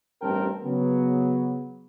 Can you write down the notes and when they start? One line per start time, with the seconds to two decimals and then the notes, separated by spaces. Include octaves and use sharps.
0.22 A1 G2 C4 A#4 G5 A5
0.63 C#3 F#3 B3